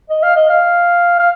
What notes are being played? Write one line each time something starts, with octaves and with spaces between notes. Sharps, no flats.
D#5
F5
D#5
F5
F5